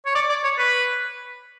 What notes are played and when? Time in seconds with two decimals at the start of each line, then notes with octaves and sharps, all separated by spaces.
0.06 C#5
0.15 D5
0.29 D5
0.44 C#5
0.58 B4